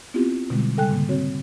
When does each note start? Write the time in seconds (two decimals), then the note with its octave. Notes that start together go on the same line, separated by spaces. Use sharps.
0.14 B3 C4 E4 F4 G4
0.50 B2 D3 G3 G#3
0.77 C#3 G3 A4 G5 G#5 F#6
0.90 G#2 D3 A#3
1.09 C4 F#4 C#5